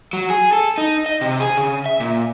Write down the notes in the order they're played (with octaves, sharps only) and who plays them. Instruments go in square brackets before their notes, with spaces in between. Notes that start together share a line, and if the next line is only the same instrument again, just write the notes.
[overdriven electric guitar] F#3
G#4
A4
D#4
D#5
C3
G#4
C#3
E5
A#2